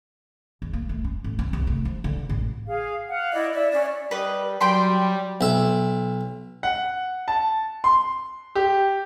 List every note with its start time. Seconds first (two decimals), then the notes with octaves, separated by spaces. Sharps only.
0.62 E2
0.73 A#3
0.89 A3
1.04 C#4
1.24 A1
1.39 C4
1.53 C2
1.67 A3
1.85 F3
2.04 D3
2.29 A1
2.67 G#4 F5
3.09 F5 F#5
3.33 E4 D5 D#5
3.53 D5 E5
3.71 C#4 D5
4.11 G3 B4 D#5
4.61 F#3 G3 G5 B5 C6
5.41 B1 E5
6.63 F#5
7.28 A5
7.84 C6
8.55 G4